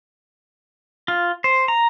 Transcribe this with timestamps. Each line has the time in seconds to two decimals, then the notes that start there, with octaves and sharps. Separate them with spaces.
1.08 F4
1.44 C5
1.68 A#5